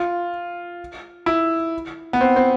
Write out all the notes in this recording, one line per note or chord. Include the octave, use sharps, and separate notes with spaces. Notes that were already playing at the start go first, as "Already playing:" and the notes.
Already playing: F4
E4
B3
C4
C4